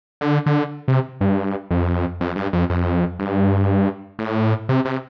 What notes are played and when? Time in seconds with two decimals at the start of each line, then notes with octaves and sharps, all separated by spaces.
0.21 D3
0.46 D3
0.88 C3
1.21 G2
1.70 F2
2.20 F2
2.36 G2
2.53 F2
2.70 F2
3.19 G2
4.19 A2
4.69 C3
4.85 C3